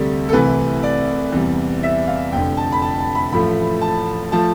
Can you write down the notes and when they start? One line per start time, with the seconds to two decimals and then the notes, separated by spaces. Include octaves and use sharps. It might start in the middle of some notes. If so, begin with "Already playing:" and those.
Already playing: D2 C3 G3 G4 A4
0.29 A4
0.33 C2 C3 E3 A3 B4
0.83 D5
1.32 E2 C3 G3
1.83 E5
2.08 F5
2.32 F1 F2 D3 G5
2.57 A5
2.72 B5
2.82 A5
2.99 A5
3.15 B5
3.32 A1 A2 F3 A3 B5
3.81 A5
4.32 F3 A3 A5